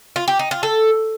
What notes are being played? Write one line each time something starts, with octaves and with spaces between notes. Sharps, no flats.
F4
G4
D#4
F4
A4